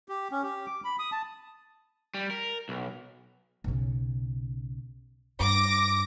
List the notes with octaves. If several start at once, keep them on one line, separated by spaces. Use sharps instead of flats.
G4
C#4
G4
D6
B5
D#6
A5
G3
A#4
B1
B1 C#3
G2 D6 A#6